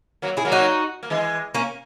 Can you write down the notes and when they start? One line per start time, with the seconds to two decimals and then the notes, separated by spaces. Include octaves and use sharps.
0.22 F#3 A#3
0.37 E4 G#4
0.45 F#3 A#3
0.52 D#4 F#4
1.03 A#3
1.10 E3 G#3
1.55 A#3 C#4